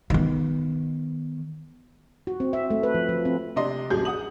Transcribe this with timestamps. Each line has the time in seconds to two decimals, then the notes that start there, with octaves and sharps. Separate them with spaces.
0.10 D#3 B3
2.27 F#4
2.40 C4
2.53 E5
2.71 A3
2.83 B4
2.94 F3
3.09 F3
3.25 C4
3.56 C3 D4 D#5 C6
3.90 D#1 A1 F#3 G4 G#4 G6
4.05 F#5 D#6 F#7